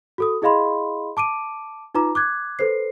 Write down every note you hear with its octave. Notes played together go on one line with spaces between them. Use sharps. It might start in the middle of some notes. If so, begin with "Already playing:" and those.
F#4 A4 D#6
E4 G#4 D#5 F5 B5 C6
A5 D6 D7 D#7
D#4 F4 B4 A#5 D6
D6 F#6 G#6
A4 B4 C5 C7